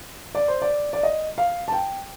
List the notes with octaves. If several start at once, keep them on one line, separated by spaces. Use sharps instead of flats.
D5
C5
D5
D5
D#5
F5
A5
G5